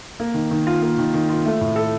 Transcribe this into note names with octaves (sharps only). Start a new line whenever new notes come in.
A#3
D#3
D#3
F4
A#3
D#3
D#3
F4
A3
A2
A4